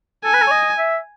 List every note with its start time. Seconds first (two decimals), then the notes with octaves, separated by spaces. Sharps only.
0.24 A4 G#5
0.33 B4
0.41 A4
0.47 C#5
0.51 D#5
0.78 E5